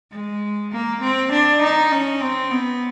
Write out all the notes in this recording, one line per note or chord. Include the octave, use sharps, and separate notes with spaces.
G#3
A#3
C4
D4
D#4
C#4
C4
B3